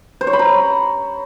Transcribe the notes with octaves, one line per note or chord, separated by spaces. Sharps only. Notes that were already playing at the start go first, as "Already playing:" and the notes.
C5
C#5
B5
A#5